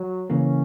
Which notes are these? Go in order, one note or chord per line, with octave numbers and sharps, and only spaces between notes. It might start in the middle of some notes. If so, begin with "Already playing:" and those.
Already playing: F#3
C#3 E3 A#3 C#4